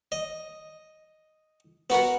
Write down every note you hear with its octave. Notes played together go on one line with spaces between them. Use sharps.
D#5
B3 F#4 A#4 F#5